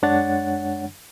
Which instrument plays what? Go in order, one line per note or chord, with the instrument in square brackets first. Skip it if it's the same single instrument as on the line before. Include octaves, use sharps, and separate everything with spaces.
[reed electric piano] F#2 G#3 D4 C#5 F#5 A6